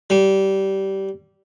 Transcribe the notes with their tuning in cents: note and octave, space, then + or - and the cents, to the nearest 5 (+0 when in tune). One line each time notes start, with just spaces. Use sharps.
G3 -20